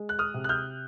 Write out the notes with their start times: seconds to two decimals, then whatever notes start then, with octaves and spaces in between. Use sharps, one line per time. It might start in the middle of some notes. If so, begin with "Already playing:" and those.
Already playing: G#3
0.09 F#6
0.19 D#6 F6
0.34 C3
0.44 F#6
0.49 F6 G6